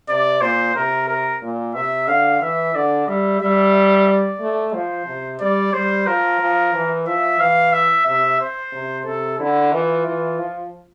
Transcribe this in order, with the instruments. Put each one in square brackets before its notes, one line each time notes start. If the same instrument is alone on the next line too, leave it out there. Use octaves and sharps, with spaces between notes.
[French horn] C3 [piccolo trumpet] D5
[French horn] A#2 [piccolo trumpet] C5
[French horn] C3 [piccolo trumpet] A#4
[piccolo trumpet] A#4
[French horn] A#2
[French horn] C3 [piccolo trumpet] E5
[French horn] D3 [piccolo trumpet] F5
[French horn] E3 [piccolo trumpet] E5
[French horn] D3 [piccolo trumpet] D5
[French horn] G3 [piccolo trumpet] E5
[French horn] G3 [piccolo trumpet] E5
[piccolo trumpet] E5
D5
[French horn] A3
[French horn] F3 [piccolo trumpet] C5
[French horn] C3
[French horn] G3 [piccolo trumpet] D5
[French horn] G3 [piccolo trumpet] C5
[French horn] F3 [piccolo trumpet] A#4
[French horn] F3
E3
[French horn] F3 [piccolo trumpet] E5
[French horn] E3 [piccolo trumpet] F5
[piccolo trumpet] E5
[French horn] C3 [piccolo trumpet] E5
[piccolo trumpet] C5
[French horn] C3
[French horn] C3 [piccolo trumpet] A4
[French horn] D3 [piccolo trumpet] E4
[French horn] E3 [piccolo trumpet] F4
[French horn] E3
F3